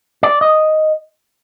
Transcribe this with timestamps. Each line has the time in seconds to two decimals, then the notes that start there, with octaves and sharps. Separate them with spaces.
0.23 D5
0.41 D#5